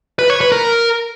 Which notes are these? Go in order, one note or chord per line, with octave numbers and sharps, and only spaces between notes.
B4
C#5
B4
A#4